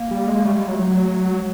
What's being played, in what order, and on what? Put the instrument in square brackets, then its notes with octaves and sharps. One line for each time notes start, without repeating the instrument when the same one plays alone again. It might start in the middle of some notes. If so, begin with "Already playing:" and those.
Already playing: [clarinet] A#3
[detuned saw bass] G3
G#3
[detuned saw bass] G3 [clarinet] A3
[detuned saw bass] G3 [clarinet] G#3
[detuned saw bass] F#3
[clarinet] A3
[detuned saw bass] F#3
[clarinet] G#3